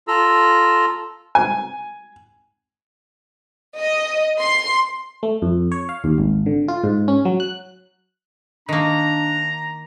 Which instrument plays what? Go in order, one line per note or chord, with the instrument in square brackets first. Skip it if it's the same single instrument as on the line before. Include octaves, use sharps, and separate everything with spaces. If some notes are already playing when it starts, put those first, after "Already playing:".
[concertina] F4 A4 A#5 E6
[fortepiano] G#5
[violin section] D#5
C6
[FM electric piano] A3
F2
C#5
F5
D#2
G#1
D3
F4
G#2
C#4
F#3
F#6
[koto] D#3 A#3 [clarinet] D4 [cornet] A#5